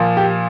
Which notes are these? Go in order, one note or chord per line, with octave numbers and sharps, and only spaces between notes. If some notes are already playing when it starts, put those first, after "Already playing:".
Already playing: A#2 F3
G4